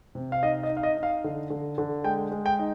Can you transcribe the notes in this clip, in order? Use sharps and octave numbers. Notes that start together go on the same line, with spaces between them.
C3
F5
D#4 D#5
D#5
D#4
F5
D#5
D#4
F5
D3
D3
D3
G#3 G5
G#3
G5
D#4